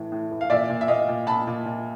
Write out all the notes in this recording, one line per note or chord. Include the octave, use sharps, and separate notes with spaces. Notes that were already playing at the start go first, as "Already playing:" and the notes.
Already playing: A2 E3
A2
E3
F5
A#2 D5 E5
A#2
E5
A#2 D#5 F5
A#2
A#2 A5 B5
A#2
A#2